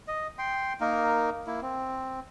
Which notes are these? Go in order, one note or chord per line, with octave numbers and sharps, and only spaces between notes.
D#5
G5 C6
A#3 D#4 A#4
A#3 E4
C4